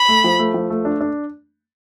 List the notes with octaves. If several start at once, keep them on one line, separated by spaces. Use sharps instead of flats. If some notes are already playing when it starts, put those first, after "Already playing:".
Already playing: B5
A3
F3
A3
F3
A3
D4
D4